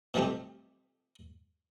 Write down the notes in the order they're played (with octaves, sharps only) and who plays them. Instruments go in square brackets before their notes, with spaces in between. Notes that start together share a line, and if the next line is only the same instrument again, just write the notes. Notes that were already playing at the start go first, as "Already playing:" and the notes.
[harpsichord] B2 F3 G3 A3 C4 G4